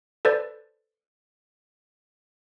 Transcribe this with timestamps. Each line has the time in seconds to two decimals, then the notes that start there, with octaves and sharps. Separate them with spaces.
0.25 A4 B4 C5 D5